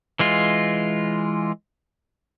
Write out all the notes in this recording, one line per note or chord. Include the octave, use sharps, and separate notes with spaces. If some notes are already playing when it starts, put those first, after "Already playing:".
E3 G#3 F4